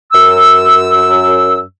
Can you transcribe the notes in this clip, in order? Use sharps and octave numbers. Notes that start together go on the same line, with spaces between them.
F#2 E6